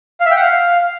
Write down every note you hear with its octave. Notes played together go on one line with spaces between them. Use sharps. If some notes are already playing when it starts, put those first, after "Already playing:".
F5
E5
G5
F#5
F5